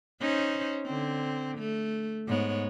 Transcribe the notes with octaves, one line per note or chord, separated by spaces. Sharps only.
C#4 D#4 C5
D3 C4
A3
G#2 B3 C#5